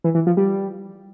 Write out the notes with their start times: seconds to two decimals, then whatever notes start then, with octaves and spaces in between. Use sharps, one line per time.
0.04 E3
0.15 E3
0.27 F3
0.37 G3